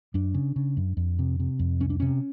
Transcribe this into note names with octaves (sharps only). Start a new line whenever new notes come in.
F#2 D4
C#3
C#3
F#2
F2
C3
C3
F2
C2 C#4
D4
C3 C#4